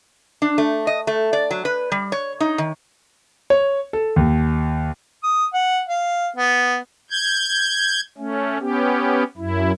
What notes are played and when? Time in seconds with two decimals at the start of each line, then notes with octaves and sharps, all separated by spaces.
0.42 D4
0.58 A3
0.87 D#5
1.07 A3
1.33 D5
1.51 F#3
1.65 B4
1.92 G3
2.12 C#5
2.40 D#4
2.58 D#3
3.50 C#5
3.93 A4
4.16 D#2
5.23 D#6
5.54 F#5
5.89 F5
6.36 B3
7.11 G6 G#6
8.18 A3 C#4
8.60 B3 C#4 G4
9.37 F#2 E4